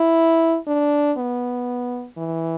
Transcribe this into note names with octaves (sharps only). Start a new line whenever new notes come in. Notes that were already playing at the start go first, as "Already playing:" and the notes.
Already playing: E4
D4
B3
E3